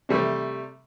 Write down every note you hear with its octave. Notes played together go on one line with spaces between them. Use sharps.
C3 G3 A3